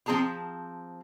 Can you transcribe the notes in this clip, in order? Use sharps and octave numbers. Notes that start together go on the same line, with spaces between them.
F3 C4 D#4 G#4 A5 A#5